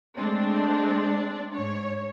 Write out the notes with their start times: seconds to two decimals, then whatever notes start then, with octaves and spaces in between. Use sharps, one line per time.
0.17 G#3 A3 C4 D4
1.55 G#2 C#5